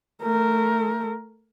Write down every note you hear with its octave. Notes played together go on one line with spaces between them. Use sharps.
A3 A#4